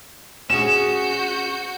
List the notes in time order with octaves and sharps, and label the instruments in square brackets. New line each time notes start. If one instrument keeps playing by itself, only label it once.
[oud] C#4 G#4 [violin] F#4 G6 [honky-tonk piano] E7